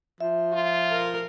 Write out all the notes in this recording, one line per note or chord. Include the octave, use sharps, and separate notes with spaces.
F3 E5
F4
A#4